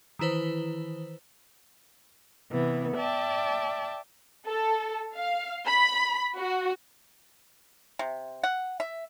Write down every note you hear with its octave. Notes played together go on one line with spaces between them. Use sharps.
D#3 E3 E4 B4 C5
C3 E3 B3
D5 E5 G5 A5
A4
F5
B5
F#4
C3
F#5
E5